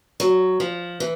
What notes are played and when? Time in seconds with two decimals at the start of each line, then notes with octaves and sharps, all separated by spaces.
0.20 F#3
0.60 F3
1.00 E3